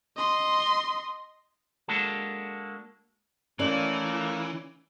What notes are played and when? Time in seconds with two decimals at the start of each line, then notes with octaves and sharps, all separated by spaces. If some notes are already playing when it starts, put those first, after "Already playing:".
0.17 D#5 C6
1.88 G#3 A#3 D4 F#4 A4
3.59 E3 A3 A#3 C#4 D5